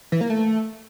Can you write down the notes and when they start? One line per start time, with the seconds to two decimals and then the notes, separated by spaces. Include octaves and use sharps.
0.12 E3
0.21 A#3
0.30 A3